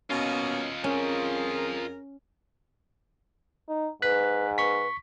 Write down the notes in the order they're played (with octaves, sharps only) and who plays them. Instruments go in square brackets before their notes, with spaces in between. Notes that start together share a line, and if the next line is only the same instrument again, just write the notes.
[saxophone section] B2 A#3 C#4 [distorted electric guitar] F4 D#5
[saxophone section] F2 G#4 A#4 [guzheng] C#4
[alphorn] D#4
[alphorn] G#2 [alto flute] B4 [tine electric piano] F#6 B6
[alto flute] B4 [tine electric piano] C#6 B6